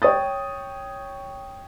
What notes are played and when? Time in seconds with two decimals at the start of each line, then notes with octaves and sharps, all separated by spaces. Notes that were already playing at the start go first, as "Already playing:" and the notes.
0.02 C#5 G5 D#6 A6